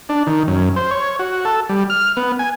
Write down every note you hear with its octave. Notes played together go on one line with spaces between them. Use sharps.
D4
D#3
F#2
C5
C#5
F#4
A4
G3
F6
B3
G#5